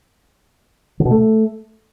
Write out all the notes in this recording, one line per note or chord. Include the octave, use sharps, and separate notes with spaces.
D3
B2
A3